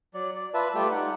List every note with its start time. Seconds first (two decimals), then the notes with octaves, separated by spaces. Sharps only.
0.14 F#3 D5
0.35 D5
0.54 F4 B4 E5 A5
0.74 G3 A3 F4 G4
0.91 D#4 F#5